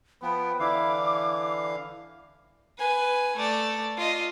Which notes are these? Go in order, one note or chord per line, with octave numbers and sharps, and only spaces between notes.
F3 B3 B4 G5
D3 E3 E4 F5 D6
E4
B4 G#5
A3 D5
F4 D#5